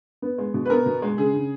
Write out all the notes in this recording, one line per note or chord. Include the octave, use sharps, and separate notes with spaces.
B3
G#3
B2
B4
B3 A#4
B2
G#3
C#3 G#4
C#3